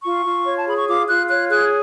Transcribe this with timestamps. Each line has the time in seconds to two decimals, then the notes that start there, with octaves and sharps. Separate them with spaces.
0.03 F4 C#6
0.24 F4
0.45 C#5
0.58 A5
0.67 G#4 B5
0.77 C#6
0.87 F4 D6
1.08 F4 F#6
1.30 C#5 F#6
1.50 G#4 F#6